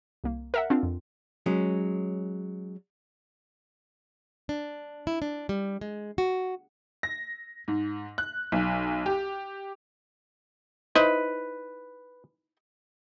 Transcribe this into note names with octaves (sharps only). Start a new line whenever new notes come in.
C2 A#3
A#4 E5 F#5
C4 D4 F4
F2
F#3 G#3 C#4
D4
E4
D4
G3
G#3
F#4
A#6
G#2
F#6
B1
G4
D#4 E4 B4 C5